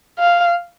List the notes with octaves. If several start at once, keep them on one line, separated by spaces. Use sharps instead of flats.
F5